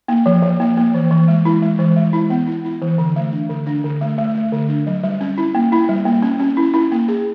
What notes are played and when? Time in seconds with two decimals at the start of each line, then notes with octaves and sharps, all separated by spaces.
0.08 A#3
0.26 F3
0.43 F3
0.60 A#3
0.77 A#3
0.94 E3
1.11 E3
1.28 G#3
1.45 E4
1.62 G#3
1.79 E3
1.96 G#3
2.13 E4
2.30 B3
2.47 E4
2.65 E4
2.82 E3
2.98 D3
3.16 A3
3.32 D4
3.50 D3
3.66 D4
3.84 D3
4.01 A3
4.18 A3
4.35 A3
4.52 D3
4.69 D4
4.87 F#3
5.04 G3
5.21 C#4
5.38 E4
5.55 A#3
5.72 E4
5.89 G3
6.05 A#3
6.22 C#4
6.40 C#4
6.57 E4
6.74 E4
6.92 A#3
7.08 G#4